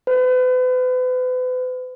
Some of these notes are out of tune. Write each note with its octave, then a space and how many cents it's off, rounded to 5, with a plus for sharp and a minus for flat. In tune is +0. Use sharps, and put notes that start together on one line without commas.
B4 +40